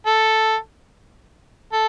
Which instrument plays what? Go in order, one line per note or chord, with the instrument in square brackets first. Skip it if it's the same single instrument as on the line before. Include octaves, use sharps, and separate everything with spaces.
[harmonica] A4
A4